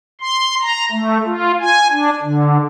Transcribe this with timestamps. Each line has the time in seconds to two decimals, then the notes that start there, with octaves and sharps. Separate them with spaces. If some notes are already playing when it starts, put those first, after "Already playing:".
0.21 C6
0.62 A#5
0.91 A3
1.25 F4
1.60 G#5
1.92 D4
2.22 D3